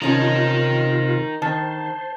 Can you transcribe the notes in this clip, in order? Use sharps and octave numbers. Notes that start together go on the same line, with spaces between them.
C3 D#3 C#4 D#4 F4 A#4 A5
D#3 C5 A5